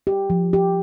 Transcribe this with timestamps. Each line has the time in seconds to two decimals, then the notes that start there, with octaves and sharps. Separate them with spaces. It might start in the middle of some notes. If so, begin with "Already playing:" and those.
0.07 G4
0.30 F3
0.53 G4